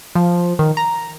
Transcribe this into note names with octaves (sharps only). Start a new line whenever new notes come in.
F3
D#3
A#5